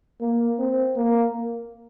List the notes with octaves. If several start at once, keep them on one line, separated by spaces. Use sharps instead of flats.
A#3
C4
A#3